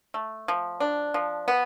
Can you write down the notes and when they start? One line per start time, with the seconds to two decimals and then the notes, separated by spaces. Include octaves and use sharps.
0.14 A3
0.48 F3
0.80 D4
1.14 F3
1.48 B3